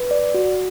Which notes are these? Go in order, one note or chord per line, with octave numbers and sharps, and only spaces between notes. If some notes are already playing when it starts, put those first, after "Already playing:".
Already playing: B4
D5
F#4